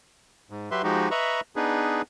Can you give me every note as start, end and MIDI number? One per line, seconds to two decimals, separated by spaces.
0.50 0.69 44
0.71 0.82 54
0.71 0.82 67
0.71 0.82 71
0.71 0.82 76
0.71 0.82 84
0.83 1.09 53
0.83 1.09 56
0.83 1.09 63
0.83 1.09 66
0.83 1.09 67
1.11 1.41 71
1.11 1.41 75
1.11 1.41 76
1.11 1.41 82
1.11 1.41 83
1.11 1.41 85
1.56 2.02 59
1.56 2.02 62
1.56 2.02 63
1.56 2.02 68
1.56 2.02 71